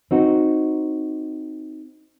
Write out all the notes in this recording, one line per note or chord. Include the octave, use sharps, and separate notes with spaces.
C4 D#4 F#4